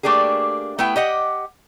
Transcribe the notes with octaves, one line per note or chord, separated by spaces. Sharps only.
A3 A#3 D4 G4 G#4
A3 B3 E4 G5
G4 D#5 F#5